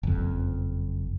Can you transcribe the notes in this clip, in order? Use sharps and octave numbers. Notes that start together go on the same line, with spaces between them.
F#1 F2